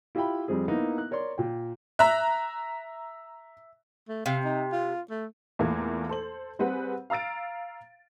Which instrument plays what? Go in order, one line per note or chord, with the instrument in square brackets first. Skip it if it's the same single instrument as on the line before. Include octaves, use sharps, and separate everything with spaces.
[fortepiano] E4 F4 G4 E5 G5 B5
F2 G3 C4 G#4
A#3 B3 D#4 E4
F#6
A#4 C#5 D5 C6
A#2 G5
[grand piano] E5 [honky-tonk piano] A#5 F#6
[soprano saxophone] A3
[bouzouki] C3 [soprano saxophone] F5
[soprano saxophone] D#4
F4
A3
[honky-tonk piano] E2 A#2 A3 A#3 G#6
A4 C5 F#7
G3 C4 G#4 B4 F#5
F5 A#5 E6 A6 D7